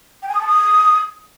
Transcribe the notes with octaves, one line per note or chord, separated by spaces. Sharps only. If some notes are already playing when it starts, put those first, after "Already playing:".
G5
G#5
D#6
A5
D#6